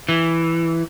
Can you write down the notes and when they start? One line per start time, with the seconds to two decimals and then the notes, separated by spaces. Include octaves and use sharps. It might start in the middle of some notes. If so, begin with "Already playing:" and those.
0.09 E3